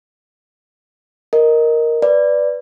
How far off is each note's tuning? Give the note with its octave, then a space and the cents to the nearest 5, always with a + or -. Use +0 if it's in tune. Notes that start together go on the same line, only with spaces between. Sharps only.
A#4 +0 D#5 +0
B4 +0 D5 +0